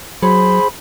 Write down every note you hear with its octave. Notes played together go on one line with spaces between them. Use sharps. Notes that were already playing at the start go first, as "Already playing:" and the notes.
F#3 G#4 C5 B5